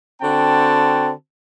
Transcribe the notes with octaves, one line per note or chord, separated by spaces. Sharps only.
D3 C4 F#4 G5 A5